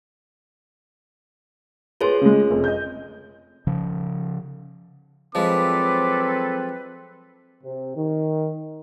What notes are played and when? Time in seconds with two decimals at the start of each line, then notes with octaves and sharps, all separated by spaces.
2.01 F4 G#4 B4 C#5 C6
2.21 C#3 G#3
2.50 F1
2.64 D#5 G6
3.67 C#3 F3
5.35 F3 F#3 G#3 C4 A4 B4 D6
7.64 C3
7.96 D#3